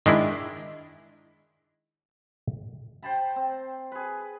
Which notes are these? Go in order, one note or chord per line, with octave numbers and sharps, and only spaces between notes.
D#3 G#3 D4 E4
C5 G5 A5 B5
C4
G#4 B4